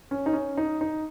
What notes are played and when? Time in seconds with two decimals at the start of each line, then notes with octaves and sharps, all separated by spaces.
0.11 C#4
0.26 D#4
0.33 C#4
0.57 D#4
0.81 D#4